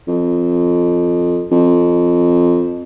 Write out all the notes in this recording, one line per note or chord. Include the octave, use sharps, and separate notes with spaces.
F2
F2